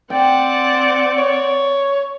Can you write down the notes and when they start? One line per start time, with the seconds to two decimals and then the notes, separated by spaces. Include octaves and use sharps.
0.10 C4 D5 F#5 G5
1.18 C#5